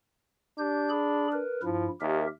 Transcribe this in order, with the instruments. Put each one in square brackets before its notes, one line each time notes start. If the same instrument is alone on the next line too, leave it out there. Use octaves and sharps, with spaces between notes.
[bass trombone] D4 [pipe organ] G4 G6
[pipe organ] G#4 B5
A#4 B4
[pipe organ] G2 E4 [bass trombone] F3
[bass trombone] D#2 [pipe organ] G4 A#4 E5